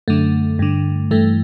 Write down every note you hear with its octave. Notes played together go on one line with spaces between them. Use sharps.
F#2 D3 A3
G2 D3
G2 E3 A3